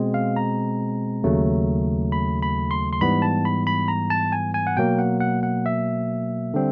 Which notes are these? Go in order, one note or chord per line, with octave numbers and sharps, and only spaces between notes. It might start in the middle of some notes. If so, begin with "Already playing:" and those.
Already playing: B2 G#3 C4
F5
A#5
D#2 C#3 F#3 A3
B5
B5
C6
C6
G#2 E3 G3 B3 B5
A5
B5
B5
A#5
A5
G#5
G#5
F#5
B2 F#3 A#3 G5
F#5
F#5
F#5
E5
D3 G3 C4